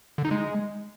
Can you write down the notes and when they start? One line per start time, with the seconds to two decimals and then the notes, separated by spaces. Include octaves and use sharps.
0.18 D3
0.25 D#4
0.31 G#3